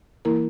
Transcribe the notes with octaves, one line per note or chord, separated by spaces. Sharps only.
E3 A#3 E4 A#4